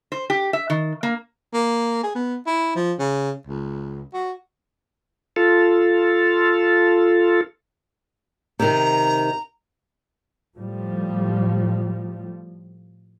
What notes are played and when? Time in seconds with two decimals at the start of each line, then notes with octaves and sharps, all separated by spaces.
0.12 C5
0.30 G4
0.53 E5
0.70 D#3
1.03 A#3
1.53 A#3
2.03 G#4
2.15 B3
2.46 E4
2.75 F3
2.99 C#3
3.47 C#2
4.13 F#4
5.36 F4 A4
8.60 C3 D#3 A#5
10.57 A2 F3 G3